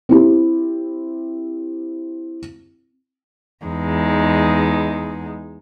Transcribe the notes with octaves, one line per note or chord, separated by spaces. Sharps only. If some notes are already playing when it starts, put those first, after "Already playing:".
C4 E4 G4
E2 G#3 D#4